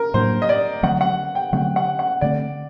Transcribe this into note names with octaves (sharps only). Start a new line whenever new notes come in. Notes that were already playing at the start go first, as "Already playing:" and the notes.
Already playing: A#4
A2 F#3 A#3 D4 C5
D#5
D5
D3 F#3 A3 C4 F#5
F#5
G5
D3 F#3 A3 C4 F#5
F#5
F#5
D3 A3 C4 D5